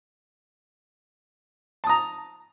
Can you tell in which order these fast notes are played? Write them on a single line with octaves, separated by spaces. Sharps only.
A5 D#6 A#5